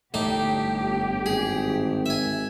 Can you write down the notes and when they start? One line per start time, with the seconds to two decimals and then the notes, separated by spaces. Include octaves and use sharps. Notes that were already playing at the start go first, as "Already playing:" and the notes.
0.14 G1 A2 D#4 G4 D6
1.26 G#1 G#4
2.06 E5 G#5